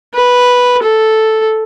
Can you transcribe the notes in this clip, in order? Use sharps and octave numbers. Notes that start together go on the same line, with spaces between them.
B4
A4